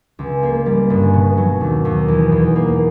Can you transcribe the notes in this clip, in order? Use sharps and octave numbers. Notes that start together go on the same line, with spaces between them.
C#2
A#3
G3
G1
B2
F#3
D#2
D#2
E2
E2
A#3